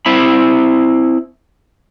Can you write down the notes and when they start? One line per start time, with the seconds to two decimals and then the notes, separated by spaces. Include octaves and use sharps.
0.06 C4 E4 B5